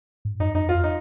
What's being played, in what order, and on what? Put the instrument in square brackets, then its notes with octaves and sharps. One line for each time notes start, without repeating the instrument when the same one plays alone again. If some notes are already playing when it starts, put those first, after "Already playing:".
[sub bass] G#2
[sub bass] F#2 [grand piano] D#4
[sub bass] F#2 [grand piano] D#4
[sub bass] F2
[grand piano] F4
[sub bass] F2
[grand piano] D#4